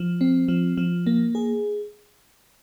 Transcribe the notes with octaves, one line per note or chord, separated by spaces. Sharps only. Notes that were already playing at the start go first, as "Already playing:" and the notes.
Already playing: F3
C4
F3
F3
A#3
G#4